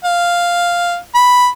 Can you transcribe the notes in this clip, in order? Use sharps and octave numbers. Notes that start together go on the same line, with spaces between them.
F5
B5